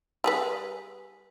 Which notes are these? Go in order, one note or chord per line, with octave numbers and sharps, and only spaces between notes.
G3 G#4 B4